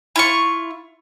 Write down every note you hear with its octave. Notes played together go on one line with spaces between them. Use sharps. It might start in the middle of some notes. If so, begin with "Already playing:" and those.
E4 F4 C#6